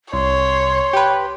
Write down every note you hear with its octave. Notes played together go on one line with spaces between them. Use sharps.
C2 C#5 C6
G4 B4